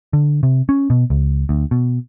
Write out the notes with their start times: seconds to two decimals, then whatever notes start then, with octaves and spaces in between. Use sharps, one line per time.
0.13 D3
0.43 C3
0.69 C#4
0.90 B2
1.10 C#2
1.49 D2
1.71 B2